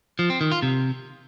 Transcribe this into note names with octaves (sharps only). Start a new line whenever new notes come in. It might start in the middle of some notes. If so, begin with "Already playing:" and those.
F3
C4
D#3
F4
C3